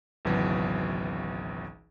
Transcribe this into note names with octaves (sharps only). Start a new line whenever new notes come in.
G#1 C#2 B2 E3 F#3